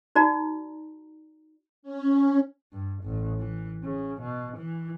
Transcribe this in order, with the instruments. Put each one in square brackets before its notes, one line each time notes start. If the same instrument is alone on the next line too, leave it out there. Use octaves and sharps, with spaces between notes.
[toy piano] D#4 F#4 D5 A#5
[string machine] C#4
[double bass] G2
A1
E3
C#3
B2
E3